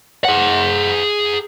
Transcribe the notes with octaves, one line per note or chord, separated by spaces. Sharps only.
G#4 F#5